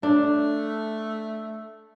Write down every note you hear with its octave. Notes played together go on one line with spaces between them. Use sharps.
A3 D4